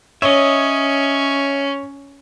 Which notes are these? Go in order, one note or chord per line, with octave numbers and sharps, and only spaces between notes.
C#4 C#5 D#5 E5